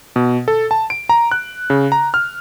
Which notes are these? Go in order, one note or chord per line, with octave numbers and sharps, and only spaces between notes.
B2
A4
A5
D7
A#5
F#6
C#3
A#5
F6